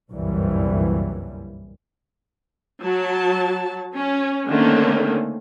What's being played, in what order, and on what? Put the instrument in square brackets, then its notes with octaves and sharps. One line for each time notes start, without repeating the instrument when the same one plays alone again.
[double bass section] G1 C2 F#2 A#2 E3 G3
[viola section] F#3 A5
C#4
D3 D#3 A3 A#3 C4 C#4